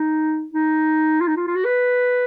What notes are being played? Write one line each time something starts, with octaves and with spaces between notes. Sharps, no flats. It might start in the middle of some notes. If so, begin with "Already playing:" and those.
Already playing: D#4
D#4
F4
D#4
F4
F4
F#4
B4